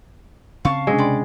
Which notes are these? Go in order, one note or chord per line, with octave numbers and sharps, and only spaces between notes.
C#3 C4 F5 A5 C#6
C3 G#3 C#4 D4
D5 G5 B5 C6